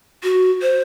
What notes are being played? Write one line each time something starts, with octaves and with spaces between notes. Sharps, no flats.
F#4
C5